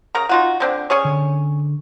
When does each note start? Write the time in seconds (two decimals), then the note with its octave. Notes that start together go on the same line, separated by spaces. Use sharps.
0.15 C#3 A#4 A#5
0.29 D#4 F4 F#4
0.60 D3 C4 D4
0.90 C#4 G#4 C#5
1.05 D3